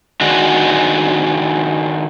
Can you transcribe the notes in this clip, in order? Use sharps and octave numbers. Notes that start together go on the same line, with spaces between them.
D#3 G#3 D4 F#4